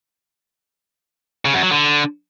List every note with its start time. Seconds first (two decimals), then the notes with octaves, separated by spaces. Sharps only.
1.45 C#3
1.54 F#2
1.63 F#3
1.72 D3